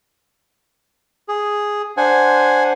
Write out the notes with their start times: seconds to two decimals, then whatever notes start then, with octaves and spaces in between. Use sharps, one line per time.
1.28 G#4
1.97 D4 C5 F#5 G#5